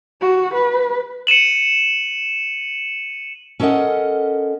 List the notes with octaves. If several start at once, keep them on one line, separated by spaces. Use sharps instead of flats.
F#4
B4
C#7 D#7 E7 F#7
C#4 A4 A#4 D5 D#5 F#5